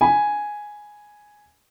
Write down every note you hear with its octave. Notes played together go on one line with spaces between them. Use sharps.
G#5 B5